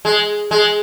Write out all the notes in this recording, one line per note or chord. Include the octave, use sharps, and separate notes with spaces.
G#3
G#3